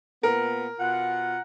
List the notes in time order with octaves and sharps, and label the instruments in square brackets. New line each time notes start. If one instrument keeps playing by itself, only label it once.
[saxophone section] A#2 B3 [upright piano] A#4
[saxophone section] B2 F4 [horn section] F#5